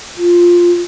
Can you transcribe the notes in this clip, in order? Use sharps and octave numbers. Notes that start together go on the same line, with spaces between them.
F4